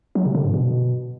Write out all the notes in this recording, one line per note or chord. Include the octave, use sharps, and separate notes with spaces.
F#3
C3
D3
G2
B2